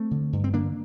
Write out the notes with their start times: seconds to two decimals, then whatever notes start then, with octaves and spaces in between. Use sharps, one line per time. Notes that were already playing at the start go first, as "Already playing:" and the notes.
Already playing: A3 C4
0.11 D3
0.33 G2
0.44 C4
0.54 D3 A#3 D4